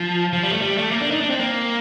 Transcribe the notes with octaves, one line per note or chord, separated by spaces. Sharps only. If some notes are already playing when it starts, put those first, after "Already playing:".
Already playing: F3
F3
G3
A3
G3
A3
A#3
D4
D#4
D4
C4
A#3